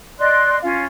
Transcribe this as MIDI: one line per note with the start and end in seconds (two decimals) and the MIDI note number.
0.18 0.58 74
0.18 0.58 75
0.18 0.58 84
0.18 0.58 90
0.62 0.85 61
0.62 0.85 65
0.62 0.85 77